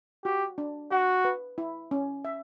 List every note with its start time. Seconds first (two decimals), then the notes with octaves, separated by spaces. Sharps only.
0.24 F#4 G4
0.58 D4
0.91 F#4 F#5
1.25 B4
1.58 E4
1.91 C#4
2.25 E5